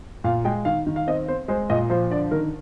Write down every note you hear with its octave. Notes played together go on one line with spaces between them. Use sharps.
A#2 F5
G#3 G5
D#3 F5
D#3
F5
C4 D#5
C4 C5
G#3 C5
A#2 D#5
F3 C5
D3 D5
D#3 A#4